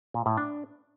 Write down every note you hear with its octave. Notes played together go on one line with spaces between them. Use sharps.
A#2
A2
D4